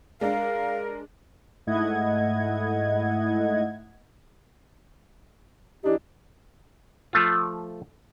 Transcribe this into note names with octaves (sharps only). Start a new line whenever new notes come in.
G#3 D4 A#4 F5
G#2 A3 E4 D#5 F#5 G#6
E3 D4 D#4 G4
F3 A3 F4